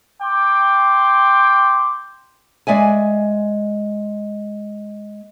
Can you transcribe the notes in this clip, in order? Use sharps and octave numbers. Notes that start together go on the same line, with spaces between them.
G5 C6 D6
G#3 D5 E5 G#5